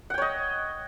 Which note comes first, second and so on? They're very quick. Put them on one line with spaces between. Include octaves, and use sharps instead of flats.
F#5 G5 C#5 D#5